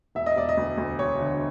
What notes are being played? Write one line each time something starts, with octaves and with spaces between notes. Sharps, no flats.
E1 E5
D#5
E1 D5
D#5
D2
D2
E1 C#5
D3